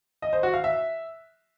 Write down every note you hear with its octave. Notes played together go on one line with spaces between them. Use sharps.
D#5
C5
F#4
F5
E5